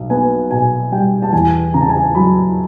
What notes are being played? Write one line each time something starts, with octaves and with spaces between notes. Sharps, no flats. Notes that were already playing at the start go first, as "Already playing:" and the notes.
Already playing: B1
B3 G#5
B2 G#5
G3 G5
A5
E2 G#5
C#3 A#5
A5
G#5
A5
F#3 B5